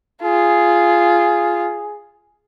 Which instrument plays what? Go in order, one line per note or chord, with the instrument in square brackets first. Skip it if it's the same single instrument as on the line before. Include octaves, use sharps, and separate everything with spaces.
[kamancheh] F4 [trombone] G#4